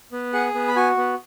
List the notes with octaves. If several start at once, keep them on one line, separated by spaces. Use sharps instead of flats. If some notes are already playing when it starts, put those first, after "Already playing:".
B3
G#4 F#5
B3
B5
F#4 G#5
B3